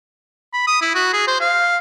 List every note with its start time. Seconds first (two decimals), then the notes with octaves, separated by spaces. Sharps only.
0.53 B5
0.67 D#6
0.82 E4
0.95 F#4
1.13 G#4
1.27 C5
1.41 F5